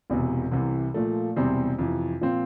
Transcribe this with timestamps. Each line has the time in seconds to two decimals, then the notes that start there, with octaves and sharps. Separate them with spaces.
0.10 E1 E2 C3
0.52 C2 C3 E3
0.94 A#2 F3 A3
1.36 E1 E2 C3 G3 C4
1.79 F2 C3 E3
2.21 A#2 F3 C4 F4